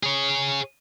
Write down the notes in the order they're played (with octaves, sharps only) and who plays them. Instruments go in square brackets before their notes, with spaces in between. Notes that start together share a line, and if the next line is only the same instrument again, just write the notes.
[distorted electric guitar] G#4 C#5